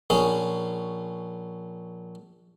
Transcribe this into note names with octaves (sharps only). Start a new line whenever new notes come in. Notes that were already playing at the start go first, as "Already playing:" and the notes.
A#1 C#4 G#4